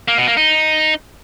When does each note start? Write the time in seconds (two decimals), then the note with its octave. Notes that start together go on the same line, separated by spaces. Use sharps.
0.08 A#3
0.18 B2
0.27 A#3
0.37 D#4